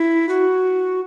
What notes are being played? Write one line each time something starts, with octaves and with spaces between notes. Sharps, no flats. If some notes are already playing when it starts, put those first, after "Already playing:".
Already playing: E4
F#4